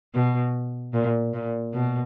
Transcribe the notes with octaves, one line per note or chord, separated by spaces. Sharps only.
B2
A#2
A#2
B2